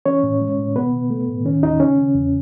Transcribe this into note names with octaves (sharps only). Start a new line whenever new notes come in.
E3 C#4 C#5
A2
G#3
A2
B2 B3 B4
B2
A3
A2
D#3 C#4
D#2 D#4
C#3 C#4
C#3
E2